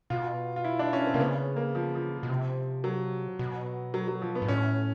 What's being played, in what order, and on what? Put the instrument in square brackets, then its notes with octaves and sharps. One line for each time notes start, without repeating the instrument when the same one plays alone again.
[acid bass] B2 [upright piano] F4
[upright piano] F4
E4
D4
C#4
C4
[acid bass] C3 [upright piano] A#3
[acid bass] C#3 [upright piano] B3
[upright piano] A#3
F3
F3
[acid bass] B2
C3
[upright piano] F#3
[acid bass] B2
[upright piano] F#3
F#3
F3
B3
[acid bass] G#2
[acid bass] A2 [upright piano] C#4